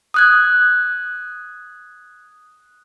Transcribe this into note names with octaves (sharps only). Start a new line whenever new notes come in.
D#6 F#6 G#6